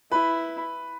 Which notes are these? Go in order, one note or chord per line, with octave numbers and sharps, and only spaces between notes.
E4 B4 B5